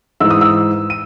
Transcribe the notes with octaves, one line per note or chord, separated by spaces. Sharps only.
G#2 E3 E6
D#6
E6
D#7